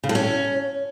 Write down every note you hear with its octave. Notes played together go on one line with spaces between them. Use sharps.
C#3
A2
C#4